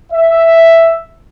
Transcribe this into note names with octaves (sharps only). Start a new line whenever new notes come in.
E5